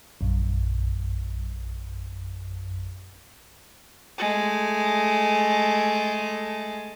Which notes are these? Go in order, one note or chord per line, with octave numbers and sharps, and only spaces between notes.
A#1 F#2
G#3 A3